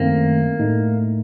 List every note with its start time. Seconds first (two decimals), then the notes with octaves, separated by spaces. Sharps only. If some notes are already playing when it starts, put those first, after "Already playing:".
Already playing: F#2 D#3 A3 A#3 C4
0.59 A2 A3 D#4